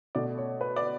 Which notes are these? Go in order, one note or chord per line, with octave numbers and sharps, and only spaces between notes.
B2 A3 D5
C#5
B4
D5